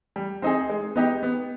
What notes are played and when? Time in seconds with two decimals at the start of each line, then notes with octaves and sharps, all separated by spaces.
0.16 G3
0.42 C4 D#4 G#4
0.69 G#3
0.96 B3 D#4 G4
1.23 B3